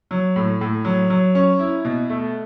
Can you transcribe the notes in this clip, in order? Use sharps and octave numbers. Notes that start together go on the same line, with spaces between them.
F#3
A2
A2
F#3
F#3
C#4
E4
B2
A3